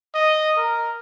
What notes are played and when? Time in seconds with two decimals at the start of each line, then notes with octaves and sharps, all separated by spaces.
0.14 D#5
0.57 A#4